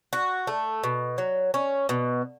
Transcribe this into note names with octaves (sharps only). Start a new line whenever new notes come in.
F#4
A3
B2
F#3
C#4
B2